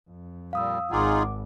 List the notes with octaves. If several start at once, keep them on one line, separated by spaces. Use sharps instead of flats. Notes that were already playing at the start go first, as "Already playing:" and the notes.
F2
A#2 G3 F5 D#6 E6
G#1 D#4 F4 G#4 F#5 D6